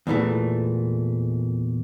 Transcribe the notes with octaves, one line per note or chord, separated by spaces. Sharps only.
E2 A#2 E3 A3